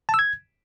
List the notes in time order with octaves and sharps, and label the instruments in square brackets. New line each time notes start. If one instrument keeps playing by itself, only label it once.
[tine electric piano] A5
E6
G#6